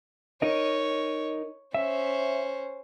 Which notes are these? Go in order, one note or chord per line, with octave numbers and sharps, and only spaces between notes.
D#4 A#4 C#5 D#5
C#4 C5 E5